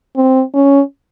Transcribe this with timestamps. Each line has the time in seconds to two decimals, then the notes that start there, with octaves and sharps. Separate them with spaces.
0.16 C4
0.54 C#4